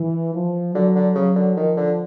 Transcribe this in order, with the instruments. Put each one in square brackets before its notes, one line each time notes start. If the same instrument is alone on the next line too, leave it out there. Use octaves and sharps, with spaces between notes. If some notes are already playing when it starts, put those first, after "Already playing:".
Already playing: [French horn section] E3
F3
[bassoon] D3 [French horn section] F#3
[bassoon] D3
[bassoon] C#3 [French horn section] F#3
[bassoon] D3
[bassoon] D#3 [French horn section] F3
[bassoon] D3